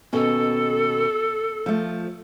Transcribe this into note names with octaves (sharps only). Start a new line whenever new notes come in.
D#2 B2 C#4 A4
F3 A3